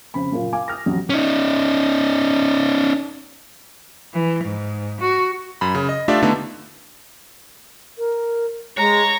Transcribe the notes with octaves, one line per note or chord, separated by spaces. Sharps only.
F2 C#3 C5 B5
F#2 A#2 C#3 A#3 F4
F5 G#5 D6
D#6 F6 A#6
A1 F2 F#3
C#4 D#4
E3
G#2
F#4
F#2 B5
C#3
D#5
A3 D4 F4 G4 D5 E5
D3 A3 B3 D#4
A#4
G#3 C#5 A#5